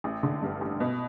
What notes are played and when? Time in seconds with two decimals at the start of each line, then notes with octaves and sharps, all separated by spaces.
0.04 A1
0.23 D3
0.42 G2
0.61 A1
0.80 B2